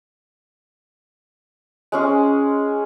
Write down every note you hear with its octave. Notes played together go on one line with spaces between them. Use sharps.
G#3 C#4 G#4